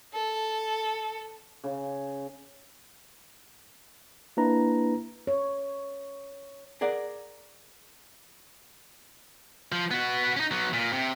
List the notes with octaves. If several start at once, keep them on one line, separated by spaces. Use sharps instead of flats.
A4
C#3
A#3 D4 E4 B4 A#5
C#5
G#4 A#4 D5 F#5
F3
B3 F#4
C#4 D#4
F#3 B3
A#2
C3